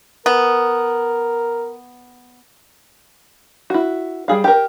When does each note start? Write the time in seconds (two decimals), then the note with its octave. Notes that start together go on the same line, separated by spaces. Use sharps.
0.26 B3 A#4
3.70 E4 F#4
4.28 G3 G#4 F5
4.44 G4 A#4